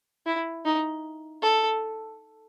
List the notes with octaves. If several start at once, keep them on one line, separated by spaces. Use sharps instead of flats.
E4
D#4
A4